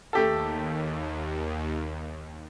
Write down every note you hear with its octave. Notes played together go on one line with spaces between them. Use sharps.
D#2 A3 G4 A4